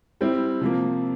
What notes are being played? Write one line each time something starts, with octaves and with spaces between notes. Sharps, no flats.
G3 C4 E4
C3 F3 A#3